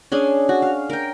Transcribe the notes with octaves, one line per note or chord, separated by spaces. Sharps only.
C#4 D4 G#4
F#4
F5
A#4 G5